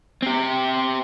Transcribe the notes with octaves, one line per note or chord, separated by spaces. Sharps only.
C4 G4